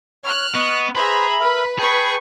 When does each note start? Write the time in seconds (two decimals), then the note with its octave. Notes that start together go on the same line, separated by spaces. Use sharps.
0.24 C#5 F6 F#6
0.55 B3 D#5 C#6
0.95 G#4 B4 C5 E5 A#5 B5
1.40 A#4 B4 E5
1.79 G#4 B4 G5 A5 C#6